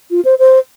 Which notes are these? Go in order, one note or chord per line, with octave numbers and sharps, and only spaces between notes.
F4
C5
C5